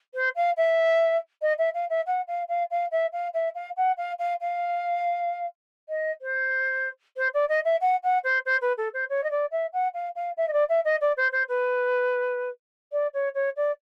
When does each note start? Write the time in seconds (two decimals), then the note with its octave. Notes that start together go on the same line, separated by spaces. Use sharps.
0.14 C5
0.36 F5
0.57 E5
1.42 D#5
1.58 E5
1.74 F5
1.90 E5
2.06 F#5
2.28 F5
2.49 F5
2.71 F5
2.92 E5
3.13 F5
3.34 E5
3.55 F5
3.77 F#5
3.98 F5
4.19 F5
4.41 F5
5.89 D#5
6.22 C5
7.17 C5
7.34 D5
7.49 D#5
7.65 E5
7.81 F#5
8.03 F#5
8.24 C5
8.46 C5
8.62 B4
8.77 A4
8.94 C5
9.10 C#5
9.24 D#5
9.31 D5
9.52 E5
9.73 F#5
9.94 F5
10.16 F5
10.37 E5
10.48 D#5
10.53 D5
10.69 E5
10.85 D#5
11.01 D5
11.17 C5
11.32 C5
11.49 B4
12.92 D5
13.14 C#5
13.35 C#5
13.57 D5